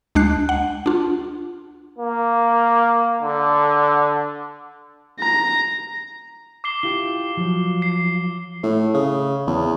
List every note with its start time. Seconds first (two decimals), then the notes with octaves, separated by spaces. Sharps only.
0.15 D2 G#3 D4 F#6 C7
0.49 F#5
0.86 D4 F4
1.99 A#3
3.22 D3
5.20 A#5
6.64 D6 C7 G7
6.83 E4 F4 G4 G7
7.37 F3 F#3
7.82 C7
8.63 A2
8.94 C#3
9.47 E2